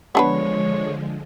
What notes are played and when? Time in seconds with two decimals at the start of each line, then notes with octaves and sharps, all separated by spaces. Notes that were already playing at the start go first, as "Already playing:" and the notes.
0.15 D3 F3 G#3 B3 D4 B4 C#5